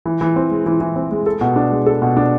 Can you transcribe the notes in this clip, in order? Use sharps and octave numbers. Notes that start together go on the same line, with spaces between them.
E3
E3
C4
G#3
E3
E3
C4
G#3
A4
B2
D4
G#3
A4
B2
D4